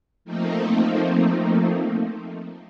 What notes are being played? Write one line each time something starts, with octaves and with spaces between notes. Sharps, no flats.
F3 A3 A#3 C4 D#4